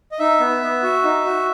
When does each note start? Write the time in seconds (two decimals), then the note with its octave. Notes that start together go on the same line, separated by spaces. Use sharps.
0.12 D#5
0.19 D#4 E5
0.40 B3
0.63 B3
0.83 F#4
1.04 D#4
1.26 F#4